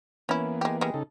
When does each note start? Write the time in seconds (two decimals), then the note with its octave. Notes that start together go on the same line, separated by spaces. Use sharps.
0.29 E3 A#3 B3 C#4 E4
0.61 G#3 G4
0.81 G3 G#3
0.94 C#3 D#4 A4